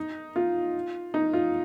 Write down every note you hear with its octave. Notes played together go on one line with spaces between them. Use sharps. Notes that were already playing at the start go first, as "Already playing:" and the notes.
Already playing: D#4
F4
D#4
F4